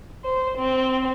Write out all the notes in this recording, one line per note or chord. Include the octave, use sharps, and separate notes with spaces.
C5
C4